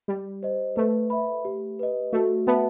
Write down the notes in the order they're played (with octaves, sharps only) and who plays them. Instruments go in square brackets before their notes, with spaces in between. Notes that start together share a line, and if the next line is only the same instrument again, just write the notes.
[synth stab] G3 [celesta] G4
[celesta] C5 D#5
[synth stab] A3 [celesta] B4
[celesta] E5 B5
G4
B4 D#5
[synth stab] A3 [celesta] F#4
[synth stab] B3 [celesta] B4 E5 A5